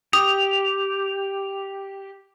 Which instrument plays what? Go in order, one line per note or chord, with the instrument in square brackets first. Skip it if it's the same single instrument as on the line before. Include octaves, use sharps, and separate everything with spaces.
[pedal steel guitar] G4 [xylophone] D#6 [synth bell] F7